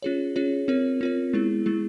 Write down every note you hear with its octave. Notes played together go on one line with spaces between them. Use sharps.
C#4 F4 G#4 C#5
C#4 F4 G#4 C#5
C4 F4 A#4 C#5
C4 F4 A#4 C#5
G#3 B3 E4 G#4
G#3 B3 E4 G#4